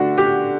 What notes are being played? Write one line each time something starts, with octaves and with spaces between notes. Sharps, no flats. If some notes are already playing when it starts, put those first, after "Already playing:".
Already playing: D3 A3 D4 F#4
G4